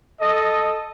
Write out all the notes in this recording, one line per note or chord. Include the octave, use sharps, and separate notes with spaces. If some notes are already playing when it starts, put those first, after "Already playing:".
A4 D#5